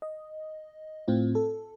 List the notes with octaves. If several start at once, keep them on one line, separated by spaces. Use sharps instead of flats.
D#5
A2 C4 F4
A4